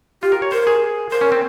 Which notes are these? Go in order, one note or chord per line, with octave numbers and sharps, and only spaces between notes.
F4 G4
A#4
C#5
A#4 C5
G#4
A#4 C5
C#4
C4